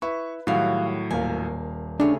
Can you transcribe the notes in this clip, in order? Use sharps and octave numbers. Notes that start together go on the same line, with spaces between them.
E4 B4 C#6
A2 D#3 F#3 G3 F#4 F5
D#1 A#3 F5 G#5
C#3 A3 D4 G4 G#4 C#5